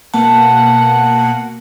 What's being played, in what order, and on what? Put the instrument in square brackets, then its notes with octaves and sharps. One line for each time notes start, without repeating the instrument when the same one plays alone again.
[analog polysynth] B2 A#3 F#5 [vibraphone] A5